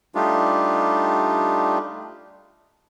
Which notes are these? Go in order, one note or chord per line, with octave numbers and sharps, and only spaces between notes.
G3 A3 D4 D#4 F4 G4